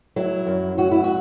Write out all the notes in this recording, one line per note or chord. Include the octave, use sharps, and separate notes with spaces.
F#3 E4
F#2
F#3 F#4
E4
F#4